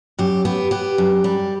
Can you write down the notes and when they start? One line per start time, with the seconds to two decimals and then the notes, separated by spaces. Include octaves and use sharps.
0.19 F#2 G4
0.45 B3 G4
0.71 B3 G4
0.98 F#2
1.24 G3